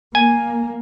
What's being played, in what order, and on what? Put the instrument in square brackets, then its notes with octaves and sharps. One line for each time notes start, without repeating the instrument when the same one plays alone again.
[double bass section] A#3 [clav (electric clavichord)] G#5